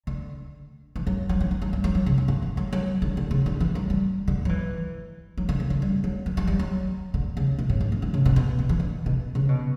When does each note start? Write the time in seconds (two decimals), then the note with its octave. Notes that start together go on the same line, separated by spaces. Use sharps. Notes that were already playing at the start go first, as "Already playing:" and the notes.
0.07 D3
0.96 E3
1.07 F#3
1.29 F#3
1.40 E3
1.51 F#3
1.62 F#3
1.73 G3
1.84 F#3
1.95 F#3
2.06 C#3
2.18 C#3
2.28 D3
2.42 E3
2.57 F#3
2.73 F#3
3.02 D3
3.17 D3
3.31 C#3
3.46 D3
3.60 E3
3.75 F#3
3.90 G3
4.28 D3
4.45 F#3
4.49 E3
5.37 F#3
5.49 D3
5.60 C#3
5.70 D3
5.82 G3
6.04 F#3
6.26 E3
6.37 F#3
6.47 G3
6.59 F#3
7.14 D3
7.37 C#3
7.59 B2
7.70 A2
7.81 G2
7.92 F#2
8.02 E3
8.14 C#3
8.25 B2
8.36 B2
8.59 D3
8.69 E3
8.80 D3
9.06 B2
9.35 C#3
9.49 B2